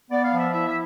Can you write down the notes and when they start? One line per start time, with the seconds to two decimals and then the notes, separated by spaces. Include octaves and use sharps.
0.11 B3 D5
0.25 F5
0.32 F3
0.38 E5
0.53 E4 E5
0.67 E5